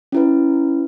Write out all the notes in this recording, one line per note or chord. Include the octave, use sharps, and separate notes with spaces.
C#4 E4 B4